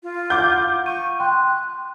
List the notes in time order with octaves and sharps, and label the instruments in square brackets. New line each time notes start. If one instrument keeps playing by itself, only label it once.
[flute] F4
[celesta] F5 F#5 [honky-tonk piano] D6 G6
[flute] C#6 [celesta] D#7
[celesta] G5 C6 [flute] F#6